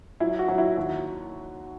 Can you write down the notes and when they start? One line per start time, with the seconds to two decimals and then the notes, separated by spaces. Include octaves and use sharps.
0.20 F#3 E4
0.39 F#4
0.48 F#3
0.58 E4
0.77 D#2 F#4